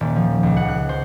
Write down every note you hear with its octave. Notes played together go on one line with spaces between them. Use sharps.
D#1
F3
C#2
F#5
F#6
C5